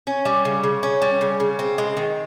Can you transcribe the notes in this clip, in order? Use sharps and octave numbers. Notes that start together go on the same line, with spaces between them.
C#4
G3
C#3
C#3
C#4
G3
C#3
C#3
C4
G#3
D#3